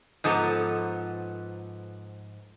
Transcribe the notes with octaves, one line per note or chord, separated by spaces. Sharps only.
G#2 F3 B3 A4 A#5